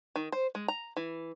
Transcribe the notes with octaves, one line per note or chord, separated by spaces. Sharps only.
D#3
C5
G#3
A#5
E3